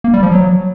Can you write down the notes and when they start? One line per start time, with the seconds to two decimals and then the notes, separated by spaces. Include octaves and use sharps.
0.04 A#3
0.14 G3
0.23 F3
0.32 F#3